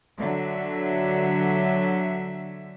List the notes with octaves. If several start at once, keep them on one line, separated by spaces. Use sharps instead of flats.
D3 F#3 E5